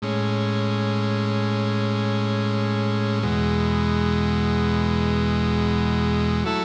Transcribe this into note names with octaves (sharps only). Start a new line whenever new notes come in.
A2 G#3 C#4
E2 B2 G#3
F#3 A3 E4 A4